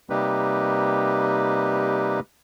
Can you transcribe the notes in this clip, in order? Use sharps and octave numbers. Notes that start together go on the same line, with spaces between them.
C3 G3 A#3 D#4 G4 B4